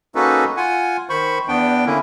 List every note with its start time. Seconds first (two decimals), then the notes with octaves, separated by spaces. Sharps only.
0.15 A#3 C#4 D#4 F#4 A4 B4
0.57 F4 F#5 G#5
1.09 D#3 C5 B5 C#6
1.48 E2 B3 D4 G5
1.86 D3 A#3 C#4 E4